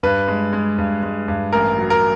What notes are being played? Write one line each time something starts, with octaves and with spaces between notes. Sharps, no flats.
G2 B4
G#3
G#3
G2
G#3
G2
A1 A#4
F#3
A#4